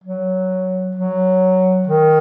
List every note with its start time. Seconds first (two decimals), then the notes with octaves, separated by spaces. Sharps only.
0.04 F#3
0.95 F#3
1.87 D#3